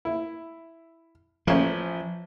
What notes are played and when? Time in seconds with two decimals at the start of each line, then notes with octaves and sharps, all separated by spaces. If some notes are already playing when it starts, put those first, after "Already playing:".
0.05 E4
1.47 A1 F3 C#4